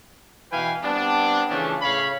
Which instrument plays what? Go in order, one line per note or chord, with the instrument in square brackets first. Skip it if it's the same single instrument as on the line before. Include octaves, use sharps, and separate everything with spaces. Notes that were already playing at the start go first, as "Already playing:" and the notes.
[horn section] B2 E3 B4 F5 G5 G#5
G3 B3 C4 D4
C#3 E3 F3 A3 C#4 D4
A2 C#3 C#5 F5 B5